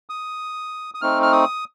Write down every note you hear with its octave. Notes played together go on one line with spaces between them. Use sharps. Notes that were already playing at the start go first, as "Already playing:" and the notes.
D#6
D#6
A3 C4 D#4 F6
F6
D#6